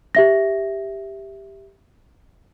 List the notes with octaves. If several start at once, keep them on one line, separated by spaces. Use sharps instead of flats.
G4 E5 A#6